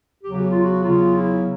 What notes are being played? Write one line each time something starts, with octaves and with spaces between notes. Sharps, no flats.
E2 C#3 F#3 G4
F#4
F4
F#4
E2 C#3 F#3 F4
E4